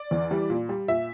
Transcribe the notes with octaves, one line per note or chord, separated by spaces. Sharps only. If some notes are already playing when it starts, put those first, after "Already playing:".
Already playing: D5
E2
E3 G3
A#2
G3
A#2 E5